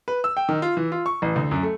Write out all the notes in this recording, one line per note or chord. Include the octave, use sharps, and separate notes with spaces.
B4
E6
G5
D#3
F4
E3
F4
C#6
A1
D2
F#2
A3